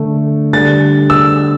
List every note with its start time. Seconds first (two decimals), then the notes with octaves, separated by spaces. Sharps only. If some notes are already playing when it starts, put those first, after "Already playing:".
Already playing: D3 A3
0.53 D3 G3 A6
1.10 E6